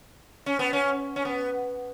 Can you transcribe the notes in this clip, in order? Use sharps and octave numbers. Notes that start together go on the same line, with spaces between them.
C#4
B3
C#4
C#4
B3